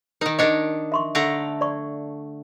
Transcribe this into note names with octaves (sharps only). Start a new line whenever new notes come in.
D#3 D#4 A#4
D#3 D4 A#4 C#5 D#5
E5 C6 C#6
D3 A3 A#5
D5 C#6